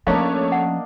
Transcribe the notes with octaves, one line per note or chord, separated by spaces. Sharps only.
F3 A3 A#3 C#4 D4 C#5 D#5 F5
F#5